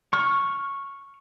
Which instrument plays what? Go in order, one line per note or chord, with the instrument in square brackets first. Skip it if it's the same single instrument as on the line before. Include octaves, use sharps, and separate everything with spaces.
[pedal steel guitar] C#6 F6